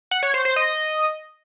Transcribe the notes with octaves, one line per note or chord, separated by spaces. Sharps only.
F#5
C#5
C5
C5
D#5